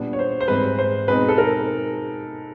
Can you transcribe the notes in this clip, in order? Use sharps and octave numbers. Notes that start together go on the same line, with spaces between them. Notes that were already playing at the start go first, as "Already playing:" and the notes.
Already playing: A#2 G3 B3 D4
C#5
C5
C5
G#2 E3 G3 C4 B4
C5
B2 G#3 C4 D#4 B4
A4
A#4